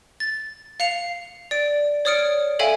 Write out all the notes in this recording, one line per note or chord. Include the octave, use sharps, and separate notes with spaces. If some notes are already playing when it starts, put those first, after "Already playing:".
A6
F5 C7 C#7 F7
D5 D7
C#5 D5 D#6 F6 C#7 D7
A4 C#5 E5 F5 G5 G#5